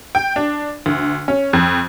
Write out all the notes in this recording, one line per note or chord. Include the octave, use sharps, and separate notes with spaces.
G5
D4
D2
C#4
F2